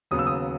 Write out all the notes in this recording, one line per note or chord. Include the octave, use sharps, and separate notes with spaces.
D#2 C#3 F#3 B3 D#6
E6
D#6